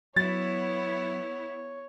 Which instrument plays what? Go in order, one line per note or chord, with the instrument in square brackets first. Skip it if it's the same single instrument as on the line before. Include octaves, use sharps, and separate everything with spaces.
[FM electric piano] F#3 [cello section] B3 E4 [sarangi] C#5 [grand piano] A6